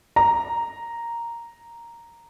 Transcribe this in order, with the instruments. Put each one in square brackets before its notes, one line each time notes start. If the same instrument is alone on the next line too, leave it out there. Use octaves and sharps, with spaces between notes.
[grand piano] A#5